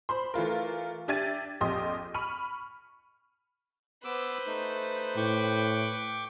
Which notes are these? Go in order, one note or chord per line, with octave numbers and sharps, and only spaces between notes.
C5 B5 C6
E3 A3 F4 A#4
D4 G4 E5 G#6 A6 D#7
A#1 F2 G4 D#5 C6 D#6
B5 C#6 F6 D#7
B3 B4 C5 D6 E6
A3 D#4
A2 G5 C#6 D6